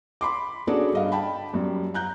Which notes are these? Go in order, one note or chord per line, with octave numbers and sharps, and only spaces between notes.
B5 C6 D6
C#4 D4 F#4 G#4 A4 D5
G2 D#5 F5
G5 A5 B5
F#2 G3
A#5 F#6 G6